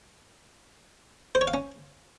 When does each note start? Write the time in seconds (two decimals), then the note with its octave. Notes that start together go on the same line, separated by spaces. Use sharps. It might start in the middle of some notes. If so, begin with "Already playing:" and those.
1.35 C5
1.41 C#5
1.47 F5
1.54 C#4